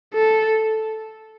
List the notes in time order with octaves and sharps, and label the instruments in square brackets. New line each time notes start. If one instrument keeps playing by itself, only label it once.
[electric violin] A4